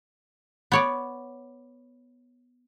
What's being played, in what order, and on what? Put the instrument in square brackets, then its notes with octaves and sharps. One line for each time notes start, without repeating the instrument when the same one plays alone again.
[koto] B3 C#5 D5